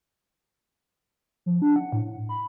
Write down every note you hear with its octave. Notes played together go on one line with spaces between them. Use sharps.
F3
D4
F#5
A2
B5